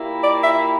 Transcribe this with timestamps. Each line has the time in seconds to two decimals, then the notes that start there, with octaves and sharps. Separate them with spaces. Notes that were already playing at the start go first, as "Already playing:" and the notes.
Already playing: A#2 A#3 E4 G4
0.23 D5
0.43 E5